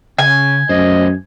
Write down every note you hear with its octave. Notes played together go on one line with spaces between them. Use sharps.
C#3 C#4 G#5
F#2 A3 C5 D#5